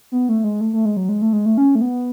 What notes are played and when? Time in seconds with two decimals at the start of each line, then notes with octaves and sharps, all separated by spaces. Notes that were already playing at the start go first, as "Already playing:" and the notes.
0.12 B3
0.29 A3
0.44 G#3
0.61 A3
0.73 A3
0.85 G#3
0.97 F#3
1.09 G#3
1.22 A3
1.33 G#3
1.46 A3
1.58 C#4
1.75 A3
1.81 B3